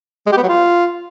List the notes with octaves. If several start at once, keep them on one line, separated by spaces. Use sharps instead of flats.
G#3
G4
B3
F#3
F4